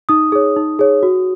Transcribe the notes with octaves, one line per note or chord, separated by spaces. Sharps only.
D#4 D#6
G#4 C#5
D#4
G#4 C#5
F#4